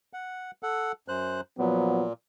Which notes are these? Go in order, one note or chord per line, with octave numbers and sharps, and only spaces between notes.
F#5
A4 F#5
F#2 C5 F#6
A#2 F3 F#3 B3